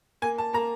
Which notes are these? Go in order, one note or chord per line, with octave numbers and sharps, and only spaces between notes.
A#3 G#5
A5
A#3 A#5